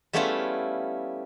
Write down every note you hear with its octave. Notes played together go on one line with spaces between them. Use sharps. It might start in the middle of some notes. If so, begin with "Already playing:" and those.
G3 A3 B3 C#4 E4 F4